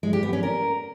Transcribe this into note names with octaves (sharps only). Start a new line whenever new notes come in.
G#3
G4
B3
C#4
A#4